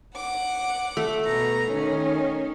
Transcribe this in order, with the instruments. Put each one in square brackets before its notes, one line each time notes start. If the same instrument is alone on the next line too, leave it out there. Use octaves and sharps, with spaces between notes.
[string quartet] F#5 D6
[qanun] A3
[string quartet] B2 A#5
D#3 C#4